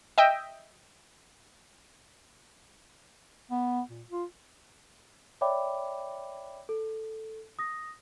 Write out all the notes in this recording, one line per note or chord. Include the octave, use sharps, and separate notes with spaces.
D#5 E5 G5
B3
A#2
F4
C#5 D5 E5 G5 B5 D6
A4
D#6 A#6